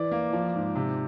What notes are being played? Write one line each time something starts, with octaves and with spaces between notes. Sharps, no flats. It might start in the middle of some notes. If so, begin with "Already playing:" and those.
Already playing: E3 D5
A#3
F3
G#2
C3